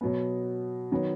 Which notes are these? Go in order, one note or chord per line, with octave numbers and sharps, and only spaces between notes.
B2 F#3 B3
D#3 F#3 B3